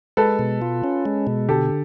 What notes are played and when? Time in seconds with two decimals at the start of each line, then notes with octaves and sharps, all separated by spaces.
0.17 G#3 A4 B4
0.39 B2
0.62 F4
0.84 C#4
1.05 G#3
1.27 B2
1.49 D3 G4 A4